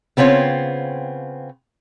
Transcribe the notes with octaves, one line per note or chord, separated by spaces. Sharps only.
C#3 B3 C4 F4 C#5